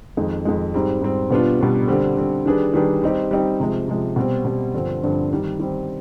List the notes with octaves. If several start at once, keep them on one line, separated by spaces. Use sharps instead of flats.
F2 D#3 G#3
F2 D#3 G#3
G#2 G3 C4
G#2 G3 C4
B2 G3 B3 D4 F4
B2 G3 B3 D4 F4
D3 G3 C4
D3 G3 C4
D#3 G3 D4 G#4 B4
D#3 G3 D4 G#4 B4
G3 C4 D#4 G4
G3 C4 D#4 G4
C3 F3 G#3
C3 F3 G#3
B2 G3 C4
B2 G3 C4
G2 D3 F3 C4
G2 D3 F3 C4
D#3 G3 C4
D#3 G3 C4